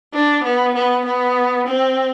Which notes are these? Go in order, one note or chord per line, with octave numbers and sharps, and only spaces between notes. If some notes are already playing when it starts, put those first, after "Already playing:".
D4
B3
B3
B3
C4